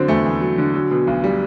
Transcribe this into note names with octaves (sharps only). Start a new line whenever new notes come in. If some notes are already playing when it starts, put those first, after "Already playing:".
Already playing: D3 F#3 C4
E2 A3
E2
F#3
D3
F#3
B2
B1
G3